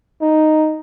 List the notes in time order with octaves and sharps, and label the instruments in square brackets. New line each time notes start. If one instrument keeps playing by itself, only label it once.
[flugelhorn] D#4